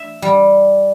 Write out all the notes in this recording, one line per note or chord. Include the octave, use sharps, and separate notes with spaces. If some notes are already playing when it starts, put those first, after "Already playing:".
Already playing: E5
G3